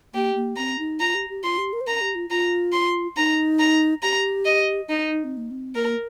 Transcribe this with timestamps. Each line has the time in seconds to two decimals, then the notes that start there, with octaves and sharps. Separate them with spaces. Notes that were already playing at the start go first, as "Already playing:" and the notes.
0.14 A#3 G4
0.35 A#3
0.57 C4 A#5
0.79 D#4
1.00 F4 A#5
1.15 G4
1.29 G4
1.44 F4 C6
1.58 G4
1.73 A#4
1.81 C5
1.87 A#4 A#5
2.01 G4
2.15 F4
2.30 F4 A#5
2.73 C6
3.17 D#4 A#5
3.59 A#5
4.03 G4 A#5
4.45 D#5
4.89 D#4
5.11 D#4
5.24 C4
5.37 A#3
5.51 C4
5.75 A#3 A#4